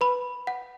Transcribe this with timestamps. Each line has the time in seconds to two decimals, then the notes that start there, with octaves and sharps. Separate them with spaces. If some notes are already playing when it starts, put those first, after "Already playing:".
0.01 B4 B5
0.47 F#5